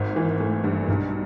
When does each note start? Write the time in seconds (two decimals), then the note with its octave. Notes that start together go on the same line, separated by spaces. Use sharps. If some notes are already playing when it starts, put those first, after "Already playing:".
Already playing: G#1 A#3
0.16 E3
0.40 A3
0.64 G2
0.88 B1